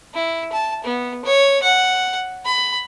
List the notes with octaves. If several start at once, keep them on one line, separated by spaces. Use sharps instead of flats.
E4
A5
B3
C#5
F#5
B5